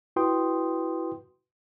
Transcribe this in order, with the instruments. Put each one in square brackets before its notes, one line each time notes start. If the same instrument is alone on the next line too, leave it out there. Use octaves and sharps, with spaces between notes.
[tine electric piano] E4 F#4 B4 G5 C6 D#6